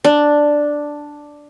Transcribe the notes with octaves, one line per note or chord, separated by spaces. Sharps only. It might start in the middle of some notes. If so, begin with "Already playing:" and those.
D4